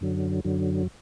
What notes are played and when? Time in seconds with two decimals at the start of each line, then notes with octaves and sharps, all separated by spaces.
0.01 F#2 D3 F#3
0.44 F#2 D3 F#3